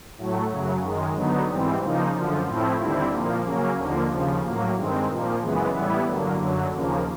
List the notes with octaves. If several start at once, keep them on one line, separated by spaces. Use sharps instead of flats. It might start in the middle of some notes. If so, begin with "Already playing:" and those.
A2 F#3 A3
F#2 C#3 F#3
F#2 D#3 G#3
D3 F#3 B3 D#4
G#2 E3 G3 C4
C#3 F3 A#3 D#4
F#2 D3 F3
A2 F3 A3 C4 E4
D#2 D3 G3 C4 E4
A#2 F3 A#3
C#3 F#3 A#3 C#4
D#2 D3 F3 A#3
D#2 C#3 F3
A2 F#3 A#3
G2 D#3 G#3 C4
A#2 F3 A#3
F#2 C#3 E3 G#3 B3
A2 E3 G3 B3 E4
G2 D3 F#3 A#3
F#2 D3 F#3
D#2 C#3 F3 A#3